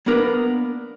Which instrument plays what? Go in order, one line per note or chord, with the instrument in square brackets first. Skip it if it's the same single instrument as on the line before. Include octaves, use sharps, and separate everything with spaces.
[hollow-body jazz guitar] A#3 B3 D4 A#4 B4